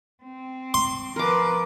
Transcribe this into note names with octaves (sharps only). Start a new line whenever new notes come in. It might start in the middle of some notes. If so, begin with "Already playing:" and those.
C4
C6
F3 A#4 B4 D6